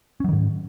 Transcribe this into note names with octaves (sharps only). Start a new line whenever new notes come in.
G#2 D#3 F#3 C#4